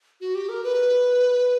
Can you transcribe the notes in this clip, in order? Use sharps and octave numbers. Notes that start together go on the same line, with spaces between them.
F#4
G4
A#4
B4